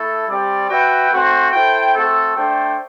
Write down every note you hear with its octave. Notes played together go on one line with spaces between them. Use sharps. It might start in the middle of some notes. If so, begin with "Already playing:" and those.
Already playing: A3 E4 A4
G3 C4 G4 D5
F#4 B4 E5 G5
A3 C4 F#4 C5
E4 A4 C5 G5
A3 C4 F#4 A4
A3 D4 A4 C5 G5